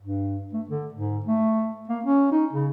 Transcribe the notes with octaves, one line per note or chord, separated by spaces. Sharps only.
G2
A3
D3
G#2
A3
A#3
C#4
D#4
C#3